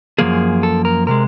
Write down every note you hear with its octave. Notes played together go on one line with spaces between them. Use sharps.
F#2 C#3 F3 A#3 G#4
A4
A#4
C3 G#3 A#4